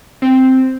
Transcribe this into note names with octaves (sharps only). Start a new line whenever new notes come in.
C4